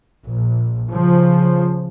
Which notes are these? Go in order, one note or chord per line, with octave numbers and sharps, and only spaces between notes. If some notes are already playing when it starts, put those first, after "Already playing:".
A#1
C#3 F3